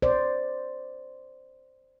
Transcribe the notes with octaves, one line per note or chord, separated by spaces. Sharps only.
C5 D5